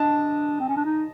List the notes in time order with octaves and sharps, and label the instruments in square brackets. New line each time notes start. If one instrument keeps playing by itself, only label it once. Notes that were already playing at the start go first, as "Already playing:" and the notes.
Already playing: [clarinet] D4 [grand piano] D#5 A5
[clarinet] C4
C#4
D4
D#4